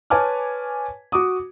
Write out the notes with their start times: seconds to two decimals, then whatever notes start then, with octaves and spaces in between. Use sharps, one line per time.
0.10 B4 C#5 G#5 A5 D6 F6
1.12 F#4 D6 D#6